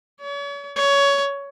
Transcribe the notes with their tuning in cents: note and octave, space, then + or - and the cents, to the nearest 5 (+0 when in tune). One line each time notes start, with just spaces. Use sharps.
C#5 +40
C#5 +15